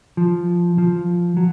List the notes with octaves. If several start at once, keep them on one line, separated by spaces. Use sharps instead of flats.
F3
F3
F#3